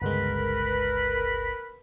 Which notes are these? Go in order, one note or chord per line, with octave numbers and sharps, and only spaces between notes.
G1 C#2 G#3 A#4 B4 B5